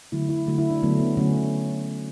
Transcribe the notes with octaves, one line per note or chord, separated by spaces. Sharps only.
D3 F#3 A3 E4
E4
D3 F#3 A3 F#4
E4
D4
D3 F#3 A3 B3
B3
D3 F#3 A3 C#4